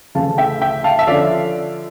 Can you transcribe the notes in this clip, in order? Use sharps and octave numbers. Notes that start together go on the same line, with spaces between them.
D2 C#3 E3 A3 F5 A5
E5 G5
E5 G5
F5 A5
E5
D3 F3 C#4 D5 F5